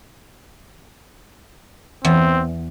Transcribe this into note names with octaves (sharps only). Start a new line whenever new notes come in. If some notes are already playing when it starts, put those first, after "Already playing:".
E2 C4